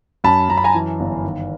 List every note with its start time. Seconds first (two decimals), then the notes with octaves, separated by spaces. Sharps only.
0.24 F#2 A5 B5
0.49 F#2 A#5
0.57 B5
0.64 G#5 A#5
0.74 E3
1.00 G1
1.24 D#3